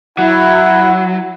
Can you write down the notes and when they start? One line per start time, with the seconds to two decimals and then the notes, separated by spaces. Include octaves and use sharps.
0.18 F#3 E4 F#5